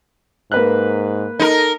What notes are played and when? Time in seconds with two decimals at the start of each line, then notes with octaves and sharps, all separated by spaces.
0.52 G#2 A#3 B4 F#6
1.39 D#4 A4 A#4